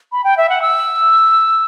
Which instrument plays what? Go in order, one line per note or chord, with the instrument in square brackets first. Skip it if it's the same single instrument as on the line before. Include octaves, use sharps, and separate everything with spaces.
[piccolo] B5
G5
E5
F#5
E6